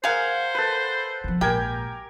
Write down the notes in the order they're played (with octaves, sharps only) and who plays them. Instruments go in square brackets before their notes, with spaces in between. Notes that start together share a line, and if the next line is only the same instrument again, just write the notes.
[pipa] G#4 F5 [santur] A#4 F#5 G#5 [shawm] C5
[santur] A4 B4
[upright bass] C3 F3
[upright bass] A#1 G#2 [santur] G4 A#4 G#5 [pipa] G5